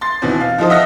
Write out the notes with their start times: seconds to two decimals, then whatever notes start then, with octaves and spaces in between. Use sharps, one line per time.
0.01 C6 A6
0.22 D#2 B2 E3 C4
0.40 F5
0.58 F3 D#4 F4 A4 C5 D#5
0.70 D#5 E5 F#5 E6 F6 A#6